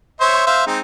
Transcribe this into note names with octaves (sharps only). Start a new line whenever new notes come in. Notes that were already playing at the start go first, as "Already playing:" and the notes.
C5 C#5 E5
C5 E5 F5
G#3 C4 D#4